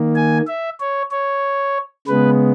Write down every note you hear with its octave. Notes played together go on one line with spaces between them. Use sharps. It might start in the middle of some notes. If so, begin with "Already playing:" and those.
Already playing: D#3 A#3
G#5
E5
C#5
C#5
C#3 G#3 B3 B4